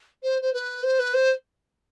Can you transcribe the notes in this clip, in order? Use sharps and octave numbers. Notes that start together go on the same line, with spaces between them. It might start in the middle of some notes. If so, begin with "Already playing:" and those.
C5
C5
B4
C5
B4
C5